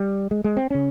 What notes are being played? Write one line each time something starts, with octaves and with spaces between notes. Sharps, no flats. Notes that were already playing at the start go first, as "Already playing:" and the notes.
Already playing: G3
G#3
G#3
C4
C#3 C#4